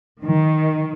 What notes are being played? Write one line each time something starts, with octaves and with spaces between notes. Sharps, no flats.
D#3